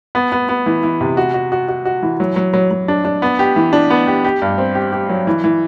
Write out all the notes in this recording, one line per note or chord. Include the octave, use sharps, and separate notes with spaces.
B3
B3
B3
E3
E3
C3
F#4
F#4
F#4
F#4
F#4
E3
F#3
F#3
F#3
F#3
D4
D4
B3
G4
E3
D4
B3
G4
G4
G2
C4
G4
G4
F#3
E3
E3